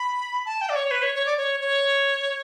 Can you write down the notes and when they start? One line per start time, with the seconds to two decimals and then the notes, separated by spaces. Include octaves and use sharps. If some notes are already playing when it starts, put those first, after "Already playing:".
Already playing: B5
0.45 A5
0.61 G5
0.69 D5
0.75 C#5
0.91 B4
1.02 C#5
1.14 C#5
1.26 D5
1.37 C#5
1.60 C#5